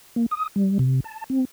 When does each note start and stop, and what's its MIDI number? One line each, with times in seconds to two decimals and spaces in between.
0.16 0.26 58
0.31 0.48 87
0.56 0.78 55
0.79 1.00 48
1.04 1.24 81
1.30 1.45 60